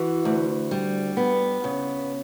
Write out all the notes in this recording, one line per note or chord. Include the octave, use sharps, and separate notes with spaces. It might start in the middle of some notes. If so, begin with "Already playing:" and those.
Already playing: E3 F#4
D2
G3
B3
C#3